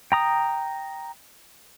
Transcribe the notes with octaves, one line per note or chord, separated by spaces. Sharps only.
G5 A#5 D#6